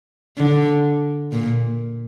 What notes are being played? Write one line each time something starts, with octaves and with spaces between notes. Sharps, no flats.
D3
A#2